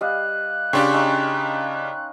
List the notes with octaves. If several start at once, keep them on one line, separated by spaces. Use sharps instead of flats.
G3 D#5 F5 F#6
C#3 D4 G4 B4 F5 G5 C6 C#6
C#4 D#4